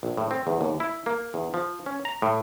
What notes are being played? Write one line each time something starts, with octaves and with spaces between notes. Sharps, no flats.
A#1
A2
C4
E2
D#2
E4
A#3
E2
F3
C#4
A#5
A2